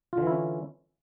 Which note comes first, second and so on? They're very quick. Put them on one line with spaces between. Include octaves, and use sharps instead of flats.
F4 D3 E3 E4 C#4